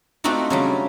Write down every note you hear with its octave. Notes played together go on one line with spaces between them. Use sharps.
A3 C4 D4 D#4 F4 F#4
C#3 F#3 G3